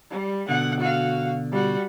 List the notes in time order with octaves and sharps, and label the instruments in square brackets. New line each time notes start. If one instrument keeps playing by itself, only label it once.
[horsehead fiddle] G3
[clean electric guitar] B2 D3 [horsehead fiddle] F#5
[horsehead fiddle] F#4 F5
G3 F#4